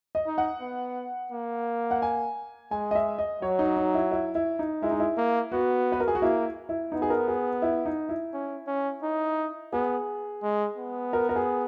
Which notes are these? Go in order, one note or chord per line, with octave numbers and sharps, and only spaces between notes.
D#5
D#4
F#5
B3
A#3
F#5
G#5
G#3 G#5
D#5
E5
D#5
F#3 C#5
D#4
D#4
E4
E4
E4
D#4
G#3 E4
D#4
E4
A#3
B3 F#4
B4
A#4
G#4
F#4
A#3 E4
E4
B3 D#4
G#4
A#4
G#4
E4
D#4
E4
C#4
C#4
D#4
B3 G#4
G#3
B3
A#4
A#4
G#4